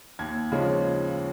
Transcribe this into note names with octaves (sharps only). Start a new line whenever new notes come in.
D#2 G#6
C#3 F3 G#3 C#4